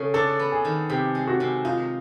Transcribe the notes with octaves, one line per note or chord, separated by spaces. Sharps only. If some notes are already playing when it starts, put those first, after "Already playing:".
Already playing: C#3 A3
D4 A4
B3
G#4
D#3
C3 G4
G#3
F#4
C3
D#4 F4